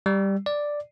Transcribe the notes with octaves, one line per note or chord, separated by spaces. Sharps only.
G3
D5